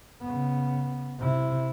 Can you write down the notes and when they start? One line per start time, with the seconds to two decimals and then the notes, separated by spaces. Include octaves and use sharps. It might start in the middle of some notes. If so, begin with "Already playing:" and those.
0.23 C#3 B3
1.19 C3 E4